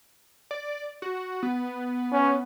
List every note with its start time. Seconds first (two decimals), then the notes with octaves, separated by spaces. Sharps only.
0.51 D5
1.02 F#4
1.43 B3
2.12 C#4